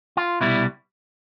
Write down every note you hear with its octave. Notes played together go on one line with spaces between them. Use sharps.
F4
C2 B2 G3 E4